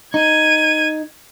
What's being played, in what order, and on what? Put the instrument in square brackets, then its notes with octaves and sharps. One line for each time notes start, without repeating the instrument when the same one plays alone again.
[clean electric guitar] D#4 [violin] G#6 D#7